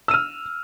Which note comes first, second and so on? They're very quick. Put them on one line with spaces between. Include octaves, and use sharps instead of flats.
E6 D#7 F6